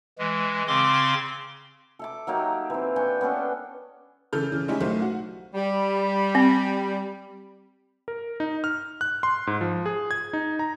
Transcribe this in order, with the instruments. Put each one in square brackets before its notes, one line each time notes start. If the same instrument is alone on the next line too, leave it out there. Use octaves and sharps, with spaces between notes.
[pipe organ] E3 G#3
C#3 C4 C6 D6
[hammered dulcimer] A4 E5 D6
F#3 A#3 D#4 G4
E3 C4
D4 G5 G#5 C#6
B3 C#4 D4 A4
[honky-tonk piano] C#3 E3 A4 F6 G6
C#3 E3
G#3 C#4 D#4 E4 G4 G#4
B1 A3 C5
F#4
[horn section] G3
[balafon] C4
[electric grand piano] A#4
D#4
F6
F#6
C6
G#2
F3
G#4
G#6
D#4
A#5